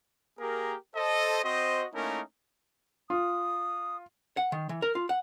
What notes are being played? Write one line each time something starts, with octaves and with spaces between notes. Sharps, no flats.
A#3 G4 G#4 A#4
A4 C5 D#5
C4 F#4 C5 D#5
A3 A#3 C#4 D#4 E4 A#4
F4 D#6
F#5
D#3
E3
A#4
F4
F#5